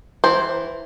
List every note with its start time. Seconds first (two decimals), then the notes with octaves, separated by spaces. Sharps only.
0.24 E3 C5